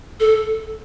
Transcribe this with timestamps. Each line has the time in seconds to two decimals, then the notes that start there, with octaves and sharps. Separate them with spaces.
0.20 A4